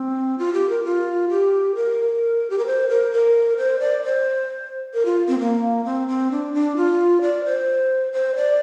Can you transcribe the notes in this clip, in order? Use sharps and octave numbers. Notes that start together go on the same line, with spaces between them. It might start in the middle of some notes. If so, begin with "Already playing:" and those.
Already playing: C4
F4
G4
A#4
F4
G4
A#4
G4
A#4
C5
A#4
A#4
C5
D5
C5
A#4
F4
C4
A#3
C4
C4
D4
D4
F4
D5
C5
C5
D5